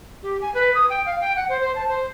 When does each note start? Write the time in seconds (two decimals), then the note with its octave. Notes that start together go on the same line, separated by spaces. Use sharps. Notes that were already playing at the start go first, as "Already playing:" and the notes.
0.22 G4
0.41 G#5
0.54 B4
0.74 D#6
0.89 G5
1.05 F5
1.20 G5
1.36 F#5
1.48 C5
1.60 C5
1.75 A5
1.88 C5